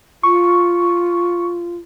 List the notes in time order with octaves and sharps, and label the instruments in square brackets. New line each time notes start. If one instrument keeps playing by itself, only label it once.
[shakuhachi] F4 [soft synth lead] C#6